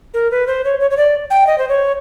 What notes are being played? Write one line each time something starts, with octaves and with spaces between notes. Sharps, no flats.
A#4
B4
C5
C#5
C#5
C#5
D5
G5
D#5
C5
C#5